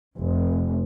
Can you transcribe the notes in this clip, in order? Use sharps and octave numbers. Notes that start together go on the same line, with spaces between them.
F1